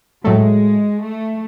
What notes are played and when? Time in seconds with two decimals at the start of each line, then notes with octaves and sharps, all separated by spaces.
0.24 A2 F#3 G#3 A3
1.01 A3